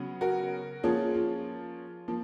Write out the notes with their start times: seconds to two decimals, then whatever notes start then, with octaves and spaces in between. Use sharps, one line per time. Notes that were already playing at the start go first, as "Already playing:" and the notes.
Already playing: C#3 F#3 B3
0.21 F#4 A#4
0.83 F3 A#3 C#4 F4 G#4
1.15 F4
2.08 F3 A#3